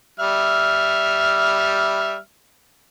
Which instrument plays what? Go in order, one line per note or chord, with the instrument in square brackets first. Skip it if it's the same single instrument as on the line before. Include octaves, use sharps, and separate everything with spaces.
[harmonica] G3 E5 F6